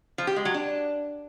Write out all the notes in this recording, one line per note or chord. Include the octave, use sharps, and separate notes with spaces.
F3
G4
G#3
F#3
D4